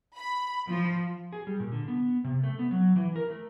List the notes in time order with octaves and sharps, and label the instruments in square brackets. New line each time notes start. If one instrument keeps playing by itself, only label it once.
[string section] B5
F3
[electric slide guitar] G#4
G3
A#2
D3
B3
C3
A3
B3
F#3
E3
A#4
A3